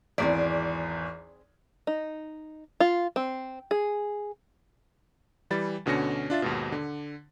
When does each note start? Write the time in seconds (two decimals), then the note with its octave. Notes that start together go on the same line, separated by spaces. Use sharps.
0.18 G#1 E2 C4 G#4 D5
1.87 D#4
2.80 F4
3.16 C4
3.71 G#4
5.50 E3 G3 B5 A6
5.86 D2 B2 D3 C#4 A#6 C#7
6.30 D4 F4 E5 A6
6.42 D#2 G#2 B2
6.72 D3